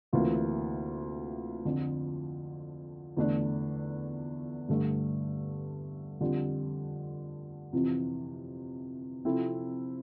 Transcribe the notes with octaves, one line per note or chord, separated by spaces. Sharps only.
D2 C3 E3 A#3 F4
F2 D3 F3
E2 D3 A3 D4
G2 D3 A3
F2 D3 G3
F2 C3 E3
C3 F3 C4 E4 A4